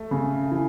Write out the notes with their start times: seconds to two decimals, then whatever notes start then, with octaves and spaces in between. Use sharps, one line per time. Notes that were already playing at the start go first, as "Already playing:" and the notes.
Already playing: A3
0.11 C#3
0.51 E3